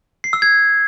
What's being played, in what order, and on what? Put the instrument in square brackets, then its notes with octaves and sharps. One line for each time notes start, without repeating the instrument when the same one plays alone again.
[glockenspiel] C7
E6
G#6